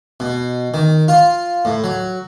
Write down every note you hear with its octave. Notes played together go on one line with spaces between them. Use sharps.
B2
D#3
F4
A2
F#3